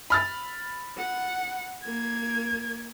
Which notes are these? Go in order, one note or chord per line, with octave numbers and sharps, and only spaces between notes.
B5 F6 A6
F#5
A#3 G#6